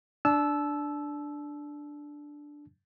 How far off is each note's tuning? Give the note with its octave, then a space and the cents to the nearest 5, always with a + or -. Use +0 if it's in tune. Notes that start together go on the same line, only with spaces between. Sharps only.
D4 +0 A5 -30 E6 +0